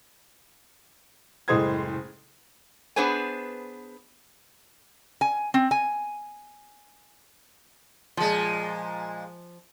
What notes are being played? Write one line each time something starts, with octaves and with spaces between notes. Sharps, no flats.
F#1 A2 G#3 C5 D#6 G#6
B3 D4 G#4 B4 C5 G#5
G#5
C4
G#5
A#2 F3 G#3